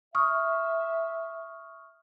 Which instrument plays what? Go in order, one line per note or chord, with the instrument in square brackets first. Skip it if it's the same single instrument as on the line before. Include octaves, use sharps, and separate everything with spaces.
[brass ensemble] E5 [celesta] C#6 D#6 F6